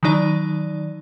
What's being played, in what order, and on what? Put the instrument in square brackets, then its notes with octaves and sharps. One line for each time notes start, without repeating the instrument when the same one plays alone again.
[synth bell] D#3 E3 F#3 D#4 D5